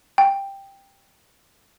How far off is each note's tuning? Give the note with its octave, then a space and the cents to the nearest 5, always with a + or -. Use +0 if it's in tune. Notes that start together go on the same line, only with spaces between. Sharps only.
G5 +10